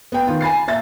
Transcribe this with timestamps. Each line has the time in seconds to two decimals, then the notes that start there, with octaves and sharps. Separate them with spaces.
0.12 B3 G5
0.27 D#3 F4
0.41 G#5 B5 A6 C7
0.68 A#2 E5 A6